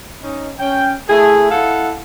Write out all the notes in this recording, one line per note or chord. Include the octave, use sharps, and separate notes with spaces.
C#4 D#4
C#4 G5
A3 E4 G#4
E4 A4 F5 F#5